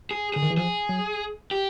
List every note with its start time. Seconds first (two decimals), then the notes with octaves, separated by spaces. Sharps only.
0.11 G#4
0.34 D3 G#4
0.42 D#3
0.51 E3
0.57 F3 G#4
0.89 F#3
1.51 G4